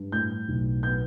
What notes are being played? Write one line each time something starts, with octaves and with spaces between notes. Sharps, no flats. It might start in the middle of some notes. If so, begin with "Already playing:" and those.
Already playing: G2
A2 G6
B1
B3 G6